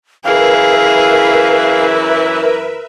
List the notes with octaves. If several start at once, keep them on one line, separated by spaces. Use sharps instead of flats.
F#2 E3 E4 G#4 A#4 B4 E5 F5